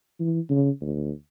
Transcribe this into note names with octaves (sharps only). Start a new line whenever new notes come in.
E3
C#3
D2